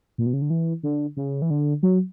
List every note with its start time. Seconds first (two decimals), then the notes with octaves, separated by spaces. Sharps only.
0.18 A#2
0.26 B2
0.33 C#3
0.42 D3
0.50 E3
0.83 D3
1.17 C#3
1.42 E3
1.50 D3
1.83 F#3